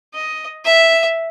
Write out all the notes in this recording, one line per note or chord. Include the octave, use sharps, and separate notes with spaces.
D#5
E5